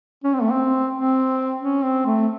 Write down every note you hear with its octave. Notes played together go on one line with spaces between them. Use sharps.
C#4
C4
A3
C4
C4
C#4
C4
A3